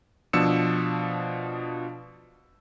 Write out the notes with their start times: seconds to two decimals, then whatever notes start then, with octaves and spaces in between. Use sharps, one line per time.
0.33 B2 F3 D4 E6 C#7 E7